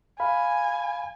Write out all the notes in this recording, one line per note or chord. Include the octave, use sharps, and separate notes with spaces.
F5 G#5 B5